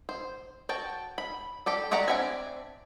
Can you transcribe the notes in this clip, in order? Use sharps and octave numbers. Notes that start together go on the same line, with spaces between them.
C5
F#4 G5 A5
B5
G4 A4 D5
F#4 G4 D5 F#5 A#5
C4 D4 B4 E5 G#5